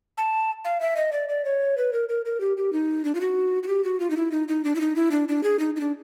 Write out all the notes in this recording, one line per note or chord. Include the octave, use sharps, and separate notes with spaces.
A5
F5
E5
D#5
D5
D5
C#5
B4
A#4
A#4
A#4
G4
G4
D#4
D4
F4
F#4
F#4
G4
F#4
F4
D#4
E4
D#4
D#4
D4
E4
D#4
E4
D4
D4
G#4
D#4
D#4
D4